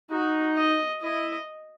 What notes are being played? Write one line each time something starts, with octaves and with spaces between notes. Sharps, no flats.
D#4 F#4
D#5
E4 D#5